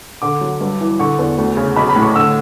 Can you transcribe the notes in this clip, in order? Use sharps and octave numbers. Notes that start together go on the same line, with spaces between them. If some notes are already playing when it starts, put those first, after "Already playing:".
D3 D6
F#3
G2
E3
D3 C#6
E2
D2
C#3
B1 B5
B5
A2
C#6
D3 E6